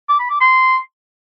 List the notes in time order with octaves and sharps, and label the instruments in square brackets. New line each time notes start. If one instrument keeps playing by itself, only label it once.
[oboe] D6
B5
D6
C6